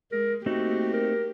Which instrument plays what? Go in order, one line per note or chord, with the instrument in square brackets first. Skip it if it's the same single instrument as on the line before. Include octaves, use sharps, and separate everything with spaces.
[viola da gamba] G#3 [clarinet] A#4
[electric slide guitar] A3 C4 D#4 [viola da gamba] A#3 G4 [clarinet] F#4
[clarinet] A#4